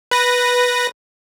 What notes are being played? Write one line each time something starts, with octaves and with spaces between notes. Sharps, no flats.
B4 A#6